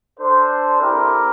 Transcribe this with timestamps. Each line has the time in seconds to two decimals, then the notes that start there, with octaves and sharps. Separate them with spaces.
0.19 D4 A4 C5
0.80 C4 E4 G4 A#4